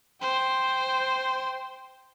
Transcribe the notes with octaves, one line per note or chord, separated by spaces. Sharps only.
C5 G5